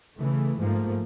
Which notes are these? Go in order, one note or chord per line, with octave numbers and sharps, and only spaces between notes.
C#3 E3 A3
G#2 F3 A3 A#3